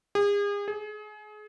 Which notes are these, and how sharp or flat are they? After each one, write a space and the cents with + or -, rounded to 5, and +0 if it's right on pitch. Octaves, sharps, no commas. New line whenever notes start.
G#4 -40
G#4 +30